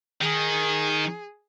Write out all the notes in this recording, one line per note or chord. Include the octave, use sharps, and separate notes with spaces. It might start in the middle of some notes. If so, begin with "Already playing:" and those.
D#3 G#4